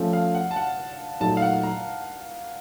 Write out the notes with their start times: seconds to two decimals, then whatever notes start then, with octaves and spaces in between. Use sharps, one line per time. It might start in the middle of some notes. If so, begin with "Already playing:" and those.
Already playing: F3 A3 C#4
0.13 F5
0.35 F#5
0.51 A5
0.56 F#5
1.20 A#2 F#3 A3 D#4 F#4 A5
1.37 F5
1.42 F#5
1.63 A#5